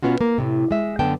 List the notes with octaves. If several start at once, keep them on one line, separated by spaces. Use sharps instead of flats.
B2 E3 B3 C#4 F4 F#4
A#3 A#4
A2 C3
G#3 E5
F#2 D3 B3 G5 A5